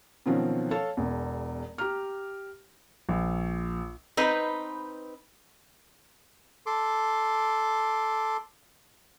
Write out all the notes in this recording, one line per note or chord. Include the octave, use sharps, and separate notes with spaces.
B2 D#3 F3 F#3 C4 C#4
A4 C#5 F5 A5
E1 E2
G4 A#5 F6
A#1
C4 D#4 B4
A4 C6 D6